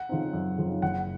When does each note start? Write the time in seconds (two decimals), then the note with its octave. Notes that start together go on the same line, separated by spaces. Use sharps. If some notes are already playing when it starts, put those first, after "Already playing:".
Already playing: F#5
0.09 C#3 F3 C4 D#4
0.33 F#2
0.58 C#3 F3 C4 D#4
0.82 F#1 F#5